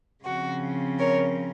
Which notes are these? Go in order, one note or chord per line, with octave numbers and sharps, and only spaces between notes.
C#3 F3 C4 F#4
A#4 C#5